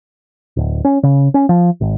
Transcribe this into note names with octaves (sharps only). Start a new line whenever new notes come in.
D1
C#4
C#3
C#4
F3
G#1